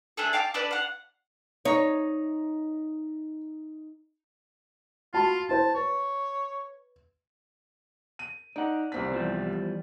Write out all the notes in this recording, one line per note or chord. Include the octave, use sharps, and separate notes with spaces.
A3 D4 G#4 A4
F5 G5 A5 D6
D4 A4 B4 D5
F5 F#5
D#4 C#5
F4 F#4 A5 B5
E4 C5 A5
B4 C#5
D#7
D#4 D5 F#5
C2 C4 B6
E2 F3 G3